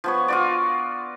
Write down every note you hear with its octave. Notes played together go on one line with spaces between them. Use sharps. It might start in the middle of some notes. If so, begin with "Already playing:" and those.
F3 B3 C#5
F4 F#4 D5